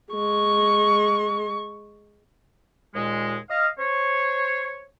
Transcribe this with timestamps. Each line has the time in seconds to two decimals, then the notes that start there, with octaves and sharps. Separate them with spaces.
0.13 G#3 C#6
2.95 D#2 A#2 G#3
3.50 D#5 F5
3.79 C5 C#5